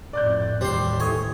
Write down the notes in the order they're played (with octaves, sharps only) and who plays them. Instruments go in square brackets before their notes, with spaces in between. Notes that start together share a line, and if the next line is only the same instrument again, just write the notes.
[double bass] F2 A2 [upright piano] D5 F#6 G6
[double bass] A1 D#2 [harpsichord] G3 C6 [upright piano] C5
[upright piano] E3 A3 D#6 [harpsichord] C#5 G#5